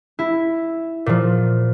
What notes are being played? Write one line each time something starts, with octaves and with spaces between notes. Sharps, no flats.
E4
A#2 F3